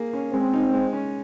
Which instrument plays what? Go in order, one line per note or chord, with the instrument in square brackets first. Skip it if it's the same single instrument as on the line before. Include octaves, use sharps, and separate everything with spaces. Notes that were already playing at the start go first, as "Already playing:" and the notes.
Already playing: [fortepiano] A#3 G#4
C#4
[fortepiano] G#3 [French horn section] C4
[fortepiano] D#4
G#3
C#4